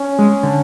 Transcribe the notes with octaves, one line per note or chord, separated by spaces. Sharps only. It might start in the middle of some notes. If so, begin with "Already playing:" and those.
Already playing: C#4
G#3
D3